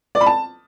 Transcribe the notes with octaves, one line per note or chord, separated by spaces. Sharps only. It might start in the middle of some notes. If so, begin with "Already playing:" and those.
D5
B5
A5